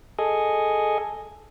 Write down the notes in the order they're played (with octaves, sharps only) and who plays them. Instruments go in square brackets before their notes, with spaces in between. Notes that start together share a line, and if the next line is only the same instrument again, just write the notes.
[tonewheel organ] G#4 A4 D#5 G#5